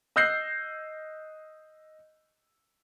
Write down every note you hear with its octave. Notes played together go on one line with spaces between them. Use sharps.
D#5 E6 F#6 G6 A#6 C7